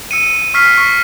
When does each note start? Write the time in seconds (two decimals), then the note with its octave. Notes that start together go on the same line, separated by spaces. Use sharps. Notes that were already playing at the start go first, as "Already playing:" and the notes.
0.11 E6 C#7 D#7
0.54 C#6 E6 F6 B6 C7
0.78 C#6